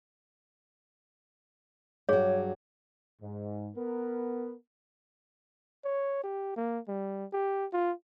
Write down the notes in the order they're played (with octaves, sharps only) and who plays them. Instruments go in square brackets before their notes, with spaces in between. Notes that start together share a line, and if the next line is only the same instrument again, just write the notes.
[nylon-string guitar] G2 F#3 [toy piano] G#4 C#5
[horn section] G#2
B3 A#4
[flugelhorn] C#5
G4
A#3
G3
G4
F4